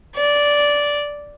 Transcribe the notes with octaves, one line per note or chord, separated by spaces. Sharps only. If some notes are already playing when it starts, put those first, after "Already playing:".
D5